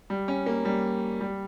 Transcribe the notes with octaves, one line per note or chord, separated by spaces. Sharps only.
G3
C#4
A#3
G3
G3